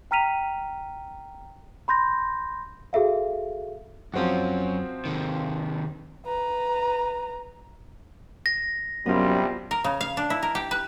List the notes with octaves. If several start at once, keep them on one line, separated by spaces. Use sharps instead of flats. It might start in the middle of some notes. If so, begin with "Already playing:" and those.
G5 A#5 F6 B6 D#7 F7
B5 C6 G6 A#6
F#4 G#4 A4 E5 F5
F#2 F3 C4 C#4 F#4
C3 D#3
B4 A#5
A#6
A#1 F#2 C3 G3 B3 F4
A#4
C#3
F5
D4
E4
A#4
G4
B4